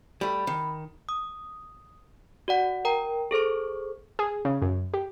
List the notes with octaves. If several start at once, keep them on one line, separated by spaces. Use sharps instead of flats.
G3 A3 B5
D#3
D#6
F#4 D5 F#5
A#4 G5 A#5
G#4 A4 C5 C#6
G#4
C#3
F#2
G4